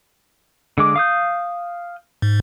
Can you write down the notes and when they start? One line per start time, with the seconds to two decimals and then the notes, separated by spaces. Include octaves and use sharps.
0.78 D3 G#3 D6
0.96 F5 D#6 G6
2.22 G#2